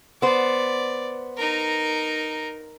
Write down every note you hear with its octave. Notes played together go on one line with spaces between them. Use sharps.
B3 C5 D5
D#4 A#4